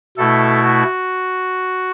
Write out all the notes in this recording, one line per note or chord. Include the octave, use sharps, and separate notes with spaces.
B2 A3 E4 A4
F#4